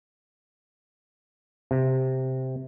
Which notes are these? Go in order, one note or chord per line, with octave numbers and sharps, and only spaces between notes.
C3